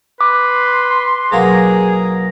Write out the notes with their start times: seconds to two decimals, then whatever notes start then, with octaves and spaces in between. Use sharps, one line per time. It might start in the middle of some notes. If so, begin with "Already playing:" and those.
0.21 B4 C6 D6
1.32 B1 A#3 F#4 G#4 A#5